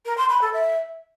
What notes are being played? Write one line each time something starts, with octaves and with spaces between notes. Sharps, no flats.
A#4
C6
B5
A4
E5